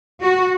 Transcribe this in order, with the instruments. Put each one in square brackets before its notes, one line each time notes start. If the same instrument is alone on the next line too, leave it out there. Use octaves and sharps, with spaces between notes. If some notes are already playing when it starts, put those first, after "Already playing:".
[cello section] F#4